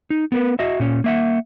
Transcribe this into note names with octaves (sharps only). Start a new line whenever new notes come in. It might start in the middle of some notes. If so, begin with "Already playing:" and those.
D#4
B3 A#4 B4
F#4 D#5 E5
A#2 C#4
A#3 E5 F#5